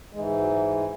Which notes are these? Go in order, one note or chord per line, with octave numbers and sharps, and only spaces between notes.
G#2 E3 G#3
F#3